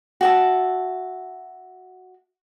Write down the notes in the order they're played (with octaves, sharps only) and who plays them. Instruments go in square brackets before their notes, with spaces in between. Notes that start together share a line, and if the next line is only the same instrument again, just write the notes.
[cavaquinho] F#4 E5 A5